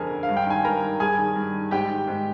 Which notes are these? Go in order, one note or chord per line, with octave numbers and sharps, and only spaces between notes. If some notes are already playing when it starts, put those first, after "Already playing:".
Already playing: F2 D3 G#4 A#4 G#5
D3
F5
G2
G5
D#3 G#5
G2 A#4 A#5
D#3
G2 G#4 G#5
D#3
G2
D#3
G#2 G4 G5
D#3
G#2